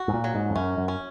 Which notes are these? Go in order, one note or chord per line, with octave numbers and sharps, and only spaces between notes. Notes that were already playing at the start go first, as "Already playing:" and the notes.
Already playing: F#4
G#2
A#2
F#3
G#2
F2
F#2 C#4
F#2
C#4